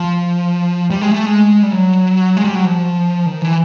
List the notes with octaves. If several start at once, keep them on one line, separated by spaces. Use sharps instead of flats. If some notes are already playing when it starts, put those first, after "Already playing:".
Already playing: F3
G3
G#3
A3
G#3
G3
F#3
G#3
G3
F#3
F3
D#3
E3